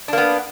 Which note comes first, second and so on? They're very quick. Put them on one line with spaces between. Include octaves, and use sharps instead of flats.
D4 A#3 B3